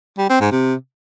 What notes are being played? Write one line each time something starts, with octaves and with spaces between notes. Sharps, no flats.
G3
C4
G#2
C3